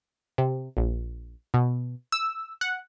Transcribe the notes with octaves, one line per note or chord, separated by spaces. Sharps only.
C3
A#1
B2
E6
F#5